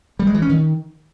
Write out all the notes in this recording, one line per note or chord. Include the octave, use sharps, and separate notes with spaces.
G3
G#3
E3
C#4
D#3